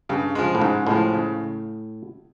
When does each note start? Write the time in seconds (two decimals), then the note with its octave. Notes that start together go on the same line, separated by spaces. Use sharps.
0.09 G2 C#3
0.35 F3 G#3
0.55 A2
0.61 G#2 C#3
0.87 A2 F3 G#3
1.13 C#3